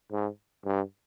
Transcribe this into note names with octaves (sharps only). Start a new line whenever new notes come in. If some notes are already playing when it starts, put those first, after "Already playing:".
G#2
G2